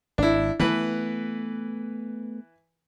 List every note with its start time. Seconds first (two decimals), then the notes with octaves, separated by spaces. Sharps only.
0.18 G#1 D4 E4
0.60 E3 A3 B3 B4